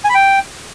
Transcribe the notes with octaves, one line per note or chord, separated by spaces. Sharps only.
G#5
B5
G5